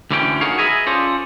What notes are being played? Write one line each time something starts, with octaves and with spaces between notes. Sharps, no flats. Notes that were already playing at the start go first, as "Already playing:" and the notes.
D2 D3 E3 C#4 C#5 G5
D#4 F#4 G#4 A#4 C#5 F5
G#4 B4 D#5 E5 G#5
C#4 F4 A4 C5 D5